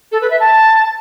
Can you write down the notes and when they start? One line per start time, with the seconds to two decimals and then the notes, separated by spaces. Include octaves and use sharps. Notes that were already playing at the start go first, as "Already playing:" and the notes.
0.12 A4
0.21 B4
0.30 E5
0.40 A5